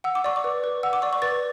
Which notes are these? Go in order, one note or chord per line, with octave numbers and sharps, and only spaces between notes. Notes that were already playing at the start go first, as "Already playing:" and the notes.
F#5 E6
D6
D5 C#6
D6
B4
B4
F#5 E6
D6
D5 C#6
C#6
B4 A6